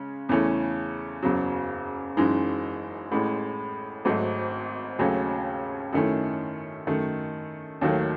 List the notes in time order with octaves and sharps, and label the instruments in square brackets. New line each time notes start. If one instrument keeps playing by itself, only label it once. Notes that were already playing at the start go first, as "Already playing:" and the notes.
Already playing: [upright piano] C#3 G#3 C#4
E2 C#3 E3 A3 C#4
F#1 E2 C#3 F#3
F#1 F#2 E3 G#3 D#4
A1 A2 G#3
G#1 G#2 F#3 A3
D#2 C#3 F#3 A3 C#4
F#2 D#3 A3 C#4 E4
F#2 D#3 A3
D#2 D#3 F#3 A3